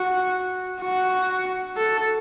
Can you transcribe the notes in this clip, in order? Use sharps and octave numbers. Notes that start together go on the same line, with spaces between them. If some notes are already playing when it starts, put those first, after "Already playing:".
Already playing: F#4
F#4
A4